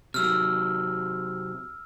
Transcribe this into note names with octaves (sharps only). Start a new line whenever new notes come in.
C3 F#3 E6 F6